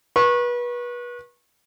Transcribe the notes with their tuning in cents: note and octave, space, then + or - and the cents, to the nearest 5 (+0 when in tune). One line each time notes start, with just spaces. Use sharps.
B4 -30 C#6 -25